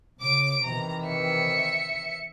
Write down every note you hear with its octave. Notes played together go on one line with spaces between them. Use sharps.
C#3 D6 D7
C3 D#3 E3 A#5
E5 C#7